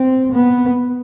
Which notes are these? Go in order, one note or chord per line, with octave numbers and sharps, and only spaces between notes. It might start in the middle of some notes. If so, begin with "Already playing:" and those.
Already playing: C4
B3